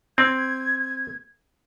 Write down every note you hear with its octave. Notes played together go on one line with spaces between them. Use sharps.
C4 G#6